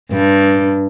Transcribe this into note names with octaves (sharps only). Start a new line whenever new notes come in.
G2